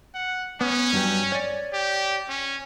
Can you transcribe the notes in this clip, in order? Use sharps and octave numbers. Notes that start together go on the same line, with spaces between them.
F#5
B3 C#4
G2 F#3 G4
C#5 D5
G4
C#4